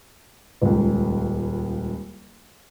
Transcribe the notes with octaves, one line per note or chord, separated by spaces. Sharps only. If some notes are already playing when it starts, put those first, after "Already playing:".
D#1 C#2